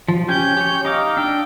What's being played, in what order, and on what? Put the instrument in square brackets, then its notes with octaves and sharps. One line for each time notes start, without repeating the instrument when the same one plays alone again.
[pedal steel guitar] F3
[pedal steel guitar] C#4 G4 G#5 [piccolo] G6
[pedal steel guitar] G4 C#5
[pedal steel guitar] D#4 D#5 F5 [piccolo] D6
[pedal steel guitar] D4 E6 [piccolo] G5